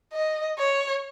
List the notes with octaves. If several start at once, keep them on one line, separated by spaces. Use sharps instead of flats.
D#5
C#5